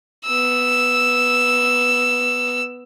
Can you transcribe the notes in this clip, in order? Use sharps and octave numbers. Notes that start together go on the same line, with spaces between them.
B3 E6